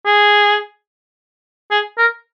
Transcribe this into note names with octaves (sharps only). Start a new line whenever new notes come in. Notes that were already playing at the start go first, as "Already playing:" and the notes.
G#4
G#4
A#4